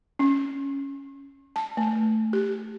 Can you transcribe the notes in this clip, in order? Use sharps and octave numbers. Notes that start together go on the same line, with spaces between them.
C#4
A5
A3
G4